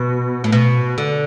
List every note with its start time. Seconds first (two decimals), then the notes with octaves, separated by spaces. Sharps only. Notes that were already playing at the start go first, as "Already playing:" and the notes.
Already playing: B2
0.44 A2
0.52 B2
0.98 D3